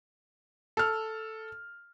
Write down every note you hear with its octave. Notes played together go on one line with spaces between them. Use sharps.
A4 F6